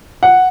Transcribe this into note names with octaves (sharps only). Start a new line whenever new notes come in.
F#5